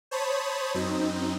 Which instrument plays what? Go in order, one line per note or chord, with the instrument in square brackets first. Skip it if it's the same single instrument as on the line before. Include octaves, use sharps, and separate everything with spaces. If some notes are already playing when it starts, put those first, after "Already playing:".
[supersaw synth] C5 C#5 A5 B5 D#6
F#2 C4 D#4